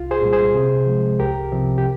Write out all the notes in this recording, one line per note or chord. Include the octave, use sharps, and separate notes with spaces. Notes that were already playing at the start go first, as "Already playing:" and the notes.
Already playing: C2 F4
G#4 C5
A#2 G3
G#4 C5
C3
F3 G#3
C2 G4 A#4
C3 F3 C4
G4